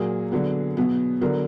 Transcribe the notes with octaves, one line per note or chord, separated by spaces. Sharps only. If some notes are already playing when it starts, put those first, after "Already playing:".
Already playing: A#2 F#3 A#3 G#4
D3 F#3 B3
B2 F#3 B3
D3 F#3 B3 A#4